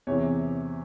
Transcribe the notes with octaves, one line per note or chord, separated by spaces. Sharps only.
E2 C3 E3 C#5